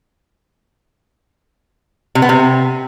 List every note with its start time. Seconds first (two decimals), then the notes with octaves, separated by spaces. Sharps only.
2.15 C3
2.22 B3
2.29 C3